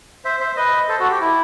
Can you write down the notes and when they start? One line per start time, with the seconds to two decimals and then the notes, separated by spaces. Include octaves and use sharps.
0.25 C5 E5
0.40 C5 E5
0.57 B4 D#5
0.89 A4 C5
1.00 F#4 A4
1.10 G4
1.21 E4